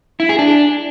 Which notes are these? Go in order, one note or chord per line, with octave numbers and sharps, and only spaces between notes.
E4
G#4
D4